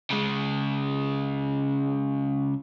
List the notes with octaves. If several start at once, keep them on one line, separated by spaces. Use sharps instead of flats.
C#3 G#3